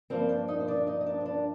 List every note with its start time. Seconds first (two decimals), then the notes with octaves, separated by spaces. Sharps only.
0.10 G2 F3 A#3 C4 C5
0.29 D4 D5
0.48 D#4 D#5
0.60 C5
0.68 D4 D5
0.87 D#4 D#5
1.01 D#5
1.06 D4 D5
1.21 C5
1.26 D4 D5